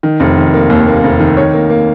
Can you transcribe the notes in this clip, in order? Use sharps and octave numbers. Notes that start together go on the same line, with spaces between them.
D#3
F1
D#3
A#3
D#2
A#3
F1
D#3
C#5
A#3
A#3